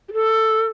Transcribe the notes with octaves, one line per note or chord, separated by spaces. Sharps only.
G4
A4